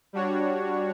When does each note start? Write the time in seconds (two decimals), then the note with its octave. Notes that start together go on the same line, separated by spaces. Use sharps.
0.13 G3 D4 F#4 C#5